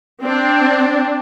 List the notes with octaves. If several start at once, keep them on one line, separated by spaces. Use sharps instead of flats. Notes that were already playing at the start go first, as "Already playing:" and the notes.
C4 D4